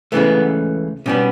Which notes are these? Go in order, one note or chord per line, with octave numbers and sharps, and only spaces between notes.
C#2 C#3 E3 A3 B3
B2 G3 B3 C#4